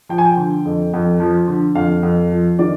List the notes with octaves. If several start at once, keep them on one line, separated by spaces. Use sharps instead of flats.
F3 G5
G#5
G5
D3
F2
F2
F3
D3
F2 F5
F2
F3
D#3 D5